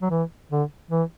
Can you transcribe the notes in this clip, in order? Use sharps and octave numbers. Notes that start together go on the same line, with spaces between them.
F#3
E3
D3
E3